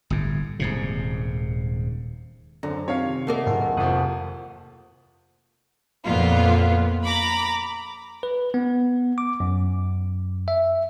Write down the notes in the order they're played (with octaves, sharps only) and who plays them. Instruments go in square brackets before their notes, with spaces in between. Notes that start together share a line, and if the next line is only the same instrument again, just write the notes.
[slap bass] G1 A2
D#1 G#2 C3
[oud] F#2 [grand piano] D3 [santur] A4 C5 [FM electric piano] A#5
[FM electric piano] C3 D#3 F4 [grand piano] C#5 F5
[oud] A3 A#3 A#4 [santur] D5 D#5 F#5
[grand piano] D1 [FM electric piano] F4 A4 [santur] G#4 C#6
[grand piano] F1 F3 [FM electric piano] F#5 D#6 F#6
[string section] F2 A#2 B3 F4
A#5 B5 D6
[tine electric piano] B4
B3
D6
F#2
E5